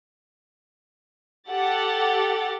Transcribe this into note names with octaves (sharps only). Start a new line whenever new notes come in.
G4 A4 F#5 A6